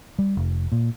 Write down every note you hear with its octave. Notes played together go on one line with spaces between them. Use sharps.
G3
F1
A#2